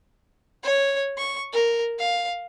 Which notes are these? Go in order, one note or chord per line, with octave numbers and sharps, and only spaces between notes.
C#5
C#6
A#4
F5